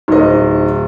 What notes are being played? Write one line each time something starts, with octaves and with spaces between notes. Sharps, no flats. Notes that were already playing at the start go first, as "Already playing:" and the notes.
D1 D#4 C5 D#5